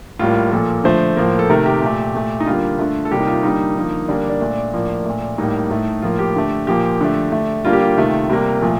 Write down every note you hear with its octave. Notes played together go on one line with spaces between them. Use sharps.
A2 G3 A#3 F4
A#2 F3 A#3 A4
D3 F3 A3 C5
A2 F3 A#3
A4
C3 D#3 A3 A#4
G4
A#2 A3
A#2 A3
D#4
D3 G3 A#3 F4
D3 A3
A4
C3 G3 A#3 G4
D#4
F4
D3 G3 A#3 D#4
D3 F3 A#3
D3 G3 A#3 D4
D4
A#2 A3
A2 F3 A#3
A#2 A3
A2 G3 A#3 D#4
A2 A3
A2 F3 A#3 F4
G4
D3 A3
A#2 F3 A#3 G4
D3 F3 A3
D3 A3
D3 G3 A#3 F4
G4
F4
C3 D#3 A3
C3 G3 A#3
A#2 F3 A3